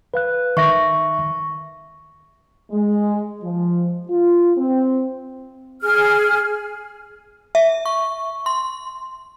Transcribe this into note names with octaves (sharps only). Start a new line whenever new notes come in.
B4 F5 F#6
D#3 E5 C#6 A#6
G#3
F3
F4
C4
G#4 F6
E5
C#6
C6